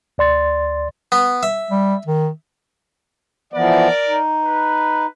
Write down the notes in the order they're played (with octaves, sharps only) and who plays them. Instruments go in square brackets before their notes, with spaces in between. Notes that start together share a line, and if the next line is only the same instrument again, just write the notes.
[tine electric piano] D2 D5 C6 A6
[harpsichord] B3
E5
[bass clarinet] G3
D#3
[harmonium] E3 F3 B3 [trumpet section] A#4 D5
[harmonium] D#4
[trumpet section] B4